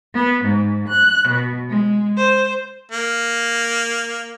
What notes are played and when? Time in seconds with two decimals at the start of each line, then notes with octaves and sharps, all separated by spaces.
0.13 B3
0.44 G#2
0.88 F#6
1.27 B2
1.69 G#3
2.17 C5
2.91 A#3